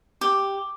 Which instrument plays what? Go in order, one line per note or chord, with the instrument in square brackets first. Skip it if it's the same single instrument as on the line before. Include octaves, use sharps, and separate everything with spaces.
[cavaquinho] G4